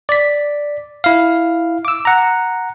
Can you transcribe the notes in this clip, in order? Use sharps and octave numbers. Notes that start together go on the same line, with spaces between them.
D5 B6
E4 F5
D6 E6
F#5 A#5